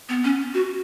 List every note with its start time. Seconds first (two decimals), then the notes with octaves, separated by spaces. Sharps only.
0.09 B3
0.24 C#4
0.54 F#4